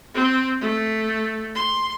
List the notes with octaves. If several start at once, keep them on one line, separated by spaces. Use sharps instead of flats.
C4
A3
C6